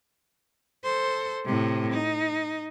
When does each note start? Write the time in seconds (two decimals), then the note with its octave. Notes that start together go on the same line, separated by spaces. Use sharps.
0.84 A4 C5
1.44 A2 C3
1.92 D#4